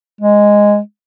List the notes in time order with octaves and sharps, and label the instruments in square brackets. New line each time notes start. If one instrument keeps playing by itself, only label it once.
[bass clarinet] G#3